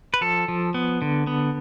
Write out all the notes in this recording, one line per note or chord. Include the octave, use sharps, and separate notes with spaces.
B4
F3 A4
F3
B3
D3
B3